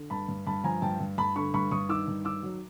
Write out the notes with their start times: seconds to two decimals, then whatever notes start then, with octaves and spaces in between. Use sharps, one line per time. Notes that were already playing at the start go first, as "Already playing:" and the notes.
Already playing: D3
0.10 G2 A5 B5
0.28 G2
0.47 G2 A5 B5
0.64 F3 G#5 A#5
0.82 G2 G5 A5
1.00 G2
1.18 G2 A5 B5
1.36 D3 B5 C#6
1.54 G2 B5 C#6
1.71 G2 C#6 D#6
1.89 D#3 D6 E6
2.08 G2
2.25 D#3 D6 E6
2.43 F#3